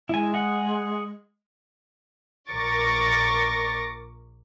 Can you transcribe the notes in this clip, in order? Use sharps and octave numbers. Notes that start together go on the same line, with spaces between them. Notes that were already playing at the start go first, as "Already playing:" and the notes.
G#3 E4 G#5
G#4 F#5
A#1 A#4 C#6 D6 A6 A#6